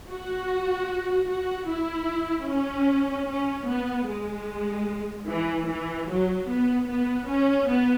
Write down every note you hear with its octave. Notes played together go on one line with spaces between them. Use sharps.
F#4
F#4
E4
C#4
C#4
B3
G#3
E3
E3
F#3
B3
B3
C#4
B3